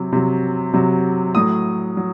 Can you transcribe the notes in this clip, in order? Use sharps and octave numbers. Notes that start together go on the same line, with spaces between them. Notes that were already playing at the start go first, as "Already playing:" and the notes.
Already playing: C3 F#3
C3 F#3
C3 F#3
A2 F#3 D#6
F#3